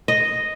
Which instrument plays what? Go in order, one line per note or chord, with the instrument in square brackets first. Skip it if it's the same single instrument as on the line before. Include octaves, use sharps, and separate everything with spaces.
[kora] D#5